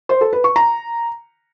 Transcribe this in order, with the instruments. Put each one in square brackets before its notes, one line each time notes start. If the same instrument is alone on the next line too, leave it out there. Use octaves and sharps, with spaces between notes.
[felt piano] C5
A4
B4
C#6
A#5